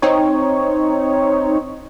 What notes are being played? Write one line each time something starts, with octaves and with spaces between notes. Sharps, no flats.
C4 D#4 C#5